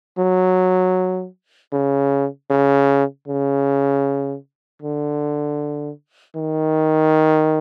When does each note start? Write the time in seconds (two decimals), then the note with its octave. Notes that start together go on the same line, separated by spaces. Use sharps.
0.18 F#3
1.73 C#3
2.50 C#3
3.28 C#3
4.82 D3
6.36 D#3